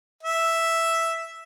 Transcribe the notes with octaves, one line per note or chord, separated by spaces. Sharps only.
E5